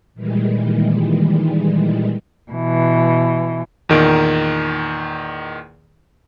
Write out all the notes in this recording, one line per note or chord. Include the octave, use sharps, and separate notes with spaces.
A#2 D#3 E3 G3 G#3
B2 E3
E2 A#2 D#3 A#4 D7